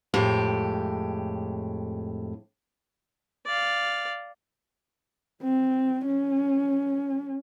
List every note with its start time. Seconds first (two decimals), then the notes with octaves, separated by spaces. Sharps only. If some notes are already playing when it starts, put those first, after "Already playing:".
0.14 F2 A2 G#3 G4
3.46 D5 F5
5.43 C4
6.06 C#4